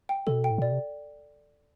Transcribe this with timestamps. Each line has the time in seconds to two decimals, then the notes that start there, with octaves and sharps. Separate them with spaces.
0.09 G5
0.27 B2 A4
0.44 G5
0.51 A2
0.58 A#2
0.62 B2 D5
0.72 C3